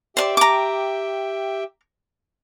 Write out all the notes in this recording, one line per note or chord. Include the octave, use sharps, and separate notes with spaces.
G4 C5 D5 E5 G5
A#5 D6